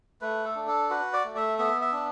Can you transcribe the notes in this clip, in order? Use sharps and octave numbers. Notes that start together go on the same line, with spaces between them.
A3 B4
A4
D4
A4
F#4 B4
D5
A3
E5
B3 E5
E5
D4